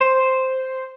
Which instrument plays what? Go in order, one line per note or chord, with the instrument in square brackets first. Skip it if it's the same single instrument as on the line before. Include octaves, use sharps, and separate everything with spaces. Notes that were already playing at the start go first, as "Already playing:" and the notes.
[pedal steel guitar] C5